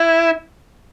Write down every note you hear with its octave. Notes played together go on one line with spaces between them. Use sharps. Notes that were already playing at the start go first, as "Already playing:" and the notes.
Already playing: E4